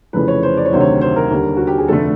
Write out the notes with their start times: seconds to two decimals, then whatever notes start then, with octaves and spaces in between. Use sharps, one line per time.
0.13 F1 F2 C#3 E3 B4
0.28 C#5
0.43 C5
0.57 D5
0.66 C#5
0.72 D2 C3 D#3 F#3 C5
0.80 C#5
1.01 C5
1.16 A#4
1.30 D#2 D3 G3
1.57 F#4
1.67 G4
1.78 G#4
1.88 F1 F2 D3 F3 A3 A4